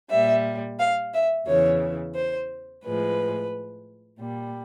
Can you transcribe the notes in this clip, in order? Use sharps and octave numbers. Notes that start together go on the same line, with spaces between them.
A#2 G3 E5
F5
E5
E2 C#3 E3 C#5
C5
A2 F3 G#3 B4
A#2 G3